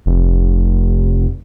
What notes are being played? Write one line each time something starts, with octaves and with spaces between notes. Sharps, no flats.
F1